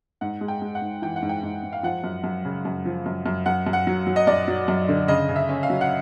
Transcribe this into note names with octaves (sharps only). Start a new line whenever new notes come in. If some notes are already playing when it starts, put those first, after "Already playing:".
G#2 F#5
G#3
G5
G#3
F#5
G#2
E3 G5
F#5
G#2
G5
G#2
G#2
F5
F3 F#5
F#2
F#2
C#3
F#2
F3
F#2
F#2
F#2 F#5
F#2
F#5
F#3
F#3
D#5
F#2 D5
F#3
F#2
D3
C#3 D#5
C#3
E5
C#4
F5
F#3
F#5